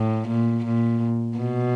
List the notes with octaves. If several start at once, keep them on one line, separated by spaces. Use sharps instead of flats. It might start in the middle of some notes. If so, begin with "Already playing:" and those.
Already playing: A2
A#2
A#2
B2